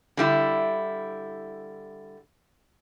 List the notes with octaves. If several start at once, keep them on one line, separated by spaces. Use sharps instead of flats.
D3 G3 E4